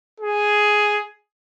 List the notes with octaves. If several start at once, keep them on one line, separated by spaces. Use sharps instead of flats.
G#4